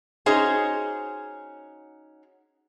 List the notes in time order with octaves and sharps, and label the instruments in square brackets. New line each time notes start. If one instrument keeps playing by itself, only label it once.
[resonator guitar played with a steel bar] C#4 D#4 F#4 G#4 C5